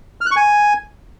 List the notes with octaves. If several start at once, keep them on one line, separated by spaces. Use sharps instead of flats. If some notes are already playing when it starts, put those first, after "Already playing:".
F6
F#6
C#6
G#5